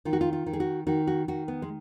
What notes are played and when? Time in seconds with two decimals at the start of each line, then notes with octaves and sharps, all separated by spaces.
0.05 D#3 F4
0.13 F#4
0.21 F4
0.33 F4
0.46 D#3
0.53 G#4
0.60 F#4
0.87 D#3 F#4
1.07 F#4
1.28 D#3 F#4
1.48 B3
1.62 G#3